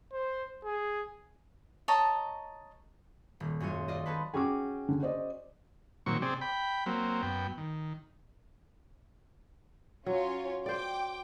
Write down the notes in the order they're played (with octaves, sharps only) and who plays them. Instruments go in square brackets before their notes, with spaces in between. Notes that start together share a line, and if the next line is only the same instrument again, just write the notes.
[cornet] C5
G#4
[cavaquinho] C#5 D#5 A5 A#5
[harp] D#1
F#2 G#3 C#4 F4 C#5
F4 D5 D#5
C4 C#4 A4 B4
[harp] C#4 F#4 G#4 [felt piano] G5 D6
[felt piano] D3
C5 D5 D#5
[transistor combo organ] A#2 D#3 F#3 C4 C#6
C3 C4 G#4 D5
G5 B5
F#3 A#3 C4
F#2 B3 G5
D#3
[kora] F#3 [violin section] C#4 F4 C#5
[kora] C5 D5 [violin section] G5 D6